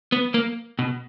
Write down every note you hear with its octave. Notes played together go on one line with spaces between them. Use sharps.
B3
A#3
B2